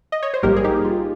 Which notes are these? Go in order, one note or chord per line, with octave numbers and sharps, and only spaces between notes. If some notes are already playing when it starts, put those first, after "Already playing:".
D#5
C#5
C5
A#1 G#2 G3 A#3 G4 A#4
G#4
D#4 G4
F4